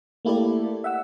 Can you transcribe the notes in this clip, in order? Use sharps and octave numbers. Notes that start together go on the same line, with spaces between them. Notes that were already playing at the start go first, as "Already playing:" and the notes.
A3 A#3 E4 G4 A4 D5
E5 F#5 E6